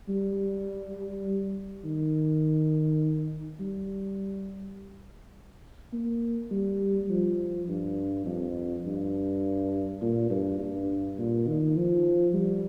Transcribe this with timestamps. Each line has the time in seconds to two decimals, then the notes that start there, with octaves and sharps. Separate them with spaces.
0.09 G3
1.84 D#3
3.60 G3
5.93 A#3
6.51 G3
7.10 F3
7.68 G2
8.25 F2
8.85 G2
10.01 A#2
10.30 G2
10.59 G2
11.18 A#2
11.47 D#3
11.76 F3
12.34 G3